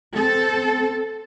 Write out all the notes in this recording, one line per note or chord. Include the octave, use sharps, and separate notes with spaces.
C4 A4